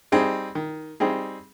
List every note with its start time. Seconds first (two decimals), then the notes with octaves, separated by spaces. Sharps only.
0.12 G3 C4 D#4 G#4
0.55 D#3
1.00 G3 C4 D#4 G#4